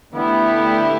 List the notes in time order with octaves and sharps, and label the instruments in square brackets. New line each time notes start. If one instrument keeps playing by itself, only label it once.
[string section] D3 A3 E4 G4 [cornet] B3